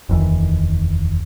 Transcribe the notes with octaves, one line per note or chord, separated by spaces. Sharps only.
F1 D#2 E3